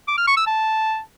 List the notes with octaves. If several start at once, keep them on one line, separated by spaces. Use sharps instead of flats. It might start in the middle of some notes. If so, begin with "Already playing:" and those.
D6
F6
C#6
E6
A5